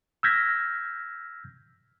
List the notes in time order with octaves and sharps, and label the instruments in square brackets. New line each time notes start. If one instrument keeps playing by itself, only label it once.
[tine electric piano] E6 F6 G6 G#6 A#6 B6